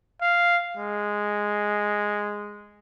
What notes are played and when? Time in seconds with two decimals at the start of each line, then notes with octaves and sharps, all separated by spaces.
0.22 F5
0.77 G#3